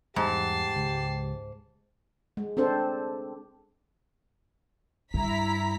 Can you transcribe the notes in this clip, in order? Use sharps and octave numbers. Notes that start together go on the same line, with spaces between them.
E2 G#2 G3 G4 A5 C7
C#2
G#3
C4 D4 A4 C5
G2 E4 A#5 B6